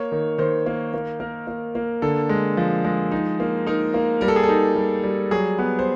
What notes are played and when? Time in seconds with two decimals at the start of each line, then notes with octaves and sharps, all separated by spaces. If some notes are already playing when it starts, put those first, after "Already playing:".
Already playing: A#3 C#5
0.12 D#3
0.38 D#3 C5
0.66 A#3
0.94 A#3
1.20 A#3 A#4
1.47 A#3
1.75 A#3
2.02 D3 A4
2.29 G#3
2.57 F3
2.85 G#3
3.11 D#4
3.40 A#3
3.67 D#4 A#4
3.94 A#3
4.21 G3 A#4
4.28 A4
4.36 G#4
4.43 A4
4.49 D#4
4.76 G3
5.03 G3
5.31 F#3 G#4
5.58 B3 B4
5.79 C5